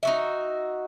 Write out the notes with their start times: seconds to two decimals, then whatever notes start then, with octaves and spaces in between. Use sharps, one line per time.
0.03 D#4 F#4 E5